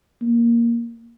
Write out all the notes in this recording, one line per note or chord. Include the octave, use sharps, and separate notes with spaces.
A#3